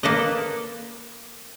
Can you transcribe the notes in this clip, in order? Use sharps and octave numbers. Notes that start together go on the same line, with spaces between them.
A#3 A4 B4 D#5